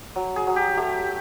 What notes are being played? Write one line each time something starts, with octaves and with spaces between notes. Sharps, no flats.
F#3
G#4
F#3
G4
A3 G4